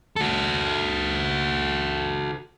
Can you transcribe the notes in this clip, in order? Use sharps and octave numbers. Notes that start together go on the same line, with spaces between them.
F#4 A4